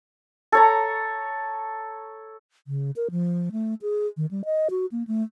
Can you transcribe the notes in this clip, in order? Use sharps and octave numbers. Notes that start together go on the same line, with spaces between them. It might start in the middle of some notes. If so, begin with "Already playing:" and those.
A4 C#5 A#5
C#3
A#4
F3
A3
G#4
D#3
G3
D#5
F#4
A#3
A3